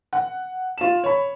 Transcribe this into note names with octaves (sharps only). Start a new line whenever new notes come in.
F#5
F4 E7
C#5 B5